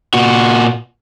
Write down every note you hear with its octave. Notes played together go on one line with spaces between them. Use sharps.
A#2 F#4